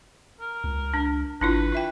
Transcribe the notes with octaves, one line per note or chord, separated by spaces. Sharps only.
A#4
C#2
D4
G#1 D4 E4 F4 B4
F4 E5 G5